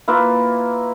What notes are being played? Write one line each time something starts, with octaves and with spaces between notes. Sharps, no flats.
A#3 E4 F4 B4